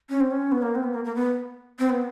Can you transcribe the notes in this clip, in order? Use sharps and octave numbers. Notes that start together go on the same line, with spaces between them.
C#4
C4
C#4
B3
A#3
C4
B3
A#3
A#3
B3
C4
B3